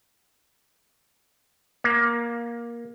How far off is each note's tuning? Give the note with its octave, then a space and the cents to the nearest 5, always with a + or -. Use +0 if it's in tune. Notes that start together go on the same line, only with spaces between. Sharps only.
A#3 +15